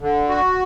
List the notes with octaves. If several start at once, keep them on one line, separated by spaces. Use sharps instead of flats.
D3
F#4